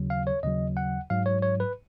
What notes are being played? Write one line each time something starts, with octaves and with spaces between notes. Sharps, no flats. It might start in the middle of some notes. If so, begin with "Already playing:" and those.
Already playing: D#2 C#3 F#3
F5
C#5
D#2 C#3 F#3 D#5
F#5
G#2 F#3 F5
C#5
C#5
B4